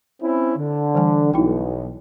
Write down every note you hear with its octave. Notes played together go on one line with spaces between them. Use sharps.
C4 C#4 E4
D3
E3 G3 G#5
B1 D#4 E4 G5